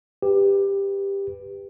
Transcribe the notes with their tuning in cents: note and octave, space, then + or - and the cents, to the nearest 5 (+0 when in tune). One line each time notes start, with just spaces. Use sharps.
G4 +15 B4 +0